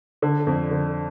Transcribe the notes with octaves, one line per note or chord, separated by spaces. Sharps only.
D3
F2
D3